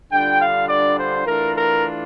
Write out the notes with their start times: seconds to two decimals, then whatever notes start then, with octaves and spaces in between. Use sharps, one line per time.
0.11 D3 G3 D4 F4 G5
0.41 F5
0.69 D5
0.97 C5
1.26 E3 A3 D4 F4 A#4
1.55 A#4